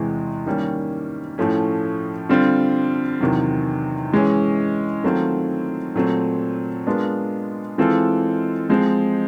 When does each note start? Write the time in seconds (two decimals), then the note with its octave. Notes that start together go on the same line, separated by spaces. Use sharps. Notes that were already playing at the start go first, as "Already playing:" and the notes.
Already playing: E2 C3 E3 G#3
0.46 D#3 G3 A#3 C#4
1.38 A2 F3 A3 C#4
2.29 D3 G3 C4 F4
3.21 E2 C3 D#3 F#3
4.13 E3 G#3 C#4
5.03 D#3 F#3 A3 C4 F4
5.95 A#2 F#3 A3 C4
6.87 G#3 B3 D4 F4 A#4
7.78 E3 G#3 C4 F4 A4
8.69 F3 G#3 C4